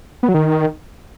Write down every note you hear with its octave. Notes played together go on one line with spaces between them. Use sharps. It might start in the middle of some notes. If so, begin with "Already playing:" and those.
B3
F#3
D#3